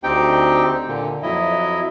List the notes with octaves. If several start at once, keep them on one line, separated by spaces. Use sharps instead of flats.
D2 C4 D#4 G4 G5
A#2 D3
F2 F#3 E4 D#5